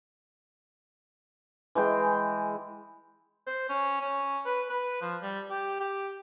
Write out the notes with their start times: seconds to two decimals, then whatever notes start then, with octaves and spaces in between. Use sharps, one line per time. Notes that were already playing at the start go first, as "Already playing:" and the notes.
1.75 E3 G#3 G5
3.46 C5
3.69 C#4
4.01 C#4
4.46 B4
4.69 B4
5.02 F3
5.22 G3
5.50 G4
5.80 G4